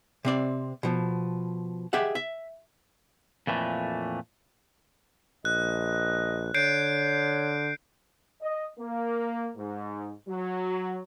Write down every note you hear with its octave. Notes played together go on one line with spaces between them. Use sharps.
C3 C4 D5
B2 F3
G4 G#4 D#5 E5 F#5
E5
F2 A#2 E3 A3
A#1 D#5 F#6
D3 C#5 G6 C7 D7
D#5
A#3
G#2
F#3